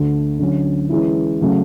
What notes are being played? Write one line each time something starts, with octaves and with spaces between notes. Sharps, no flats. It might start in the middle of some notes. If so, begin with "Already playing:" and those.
Already playing: D2 D3 A3
D3 F#3 C#4
E3 G#3 C#4 E4
C#3 F#3 A3